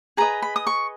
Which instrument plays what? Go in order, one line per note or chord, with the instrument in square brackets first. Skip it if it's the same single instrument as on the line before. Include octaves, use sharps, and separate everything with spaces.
[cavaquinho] G#4 B4 D#5 A#5
B5
D#6
C#6